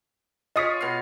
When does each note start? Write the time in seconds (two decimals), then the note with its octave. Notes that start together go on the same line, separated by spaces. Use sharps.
0.56 F4 G#4 C#5 D#5 D#6 B6
0.81 B2 F5